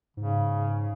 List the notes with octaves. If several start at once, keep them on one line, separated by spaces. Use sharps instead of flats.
G#2 C#3